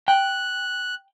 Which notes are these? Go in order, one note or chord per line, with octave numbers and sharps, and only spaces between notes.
G5 F#6